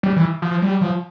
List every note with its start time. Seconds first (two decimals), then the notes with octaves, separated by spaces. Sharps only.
0.03 G3
0.16 E3
0.42 F3
0.62 G3
0.81 F3